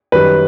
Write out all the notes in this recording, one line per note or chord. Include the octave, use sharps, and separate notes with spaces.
F#2 D#3 G3 B4